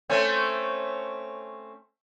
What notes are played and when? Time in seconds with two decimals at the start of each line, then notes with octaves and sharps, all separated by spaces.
0.09 A3 C4 C#4